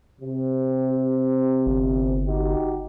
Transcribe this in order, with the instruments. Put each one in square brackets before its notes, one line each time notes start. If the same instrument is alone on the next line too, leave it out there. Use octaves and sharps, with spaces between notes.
[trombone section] C3
[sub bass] G1
[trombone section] D#4 F#4 G4